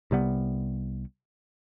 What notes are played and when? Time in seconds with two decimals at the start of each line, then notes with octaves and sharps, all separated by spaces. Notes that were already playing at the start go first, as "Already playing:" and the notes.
0.11 C2 C3 G3 B3